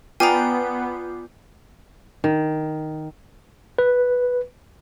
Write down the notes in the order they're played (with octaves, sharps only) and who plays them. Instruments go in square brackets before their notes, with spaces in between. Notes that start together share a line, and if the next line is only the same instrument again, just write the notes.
[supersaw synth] B3 [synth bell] F4 D6 G6 [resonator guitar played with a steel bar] D5 G5 [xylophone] G#5 A#5
[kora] D#3
[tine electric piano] B4